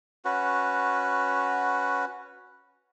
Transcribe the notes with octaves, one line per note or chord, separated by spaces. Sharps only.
C#4 F#4 B4